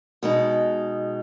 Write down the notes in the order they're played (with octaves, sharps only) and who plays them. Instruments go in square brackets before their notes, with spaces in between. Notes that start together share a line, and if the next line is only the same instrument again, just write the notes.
[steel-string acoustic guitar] B2 G#3 D#4